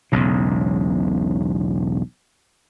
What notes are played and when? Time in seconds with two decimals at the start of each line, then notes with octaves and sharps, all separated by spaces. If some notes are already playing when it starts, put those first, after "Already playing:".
0.12 E1 B1 C#3